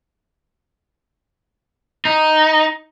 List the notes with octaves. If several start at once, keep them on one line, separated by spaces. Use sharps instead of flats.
D#4